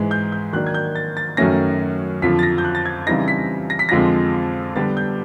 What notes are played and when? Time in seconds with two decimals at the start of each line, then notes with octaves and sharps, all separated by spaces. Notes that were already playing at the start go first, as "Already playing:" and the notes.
Already playing: G#2 E3 G#3
0.11 G6
0.32 G6
0.53 D#3 F#3 A#3 D4 F#6
0.67 G#6
0.74 G6
0.95 A6
1.17 A6
1.37 F#2 D#3 F#3 A3 C#4 A#6
2.22 F2 D3 F3 B6
2.39 A6
2.43 A#6
2.58 G6
2.64 F#6
2.75 A6
2.86 G#6
3.07 C#3 E3 G3 C4 D#4 A#6
3.28 B6
3.70 A#6
3.79 B6
3.89 F2 D3 F3 G#3 C4 A#6
4.75 D3 G3 B3 A6
4.97 G6